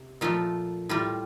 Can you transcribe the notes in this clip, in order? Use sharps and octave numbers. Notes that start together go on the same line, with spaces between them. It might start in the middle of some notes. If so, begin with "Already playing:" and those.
Already playing: C3
A#2 F3 A3 F4
A2 G3 F4